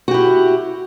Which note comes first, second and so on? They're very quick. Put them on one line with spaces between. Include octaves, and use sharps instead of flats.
F#4 G4 E4